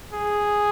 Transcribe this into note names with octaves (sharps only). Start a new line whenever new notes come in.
G#4